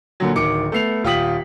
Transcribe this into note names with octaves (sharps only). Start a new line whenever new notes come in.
A#2 D3 F#3
D1 D#3 D6 C#7
A3 B3 C7 F7
D#1 F4 G5 D#6 B6 F#7